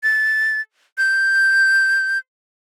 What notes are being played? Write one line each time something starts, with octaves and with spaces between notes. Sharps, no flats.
A6
G6